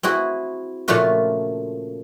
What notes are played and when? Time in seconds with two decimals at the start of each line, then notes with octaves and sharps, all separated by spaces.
0.03 C4 E4 F#4 G#4
0.88 A#2 C#3 F3 A3 F4 F#4